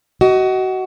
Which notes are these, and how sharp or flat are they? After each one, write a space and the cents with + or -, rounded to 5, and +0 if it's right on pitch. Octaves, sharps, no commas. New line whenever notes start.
F#4 +25 D#5 +20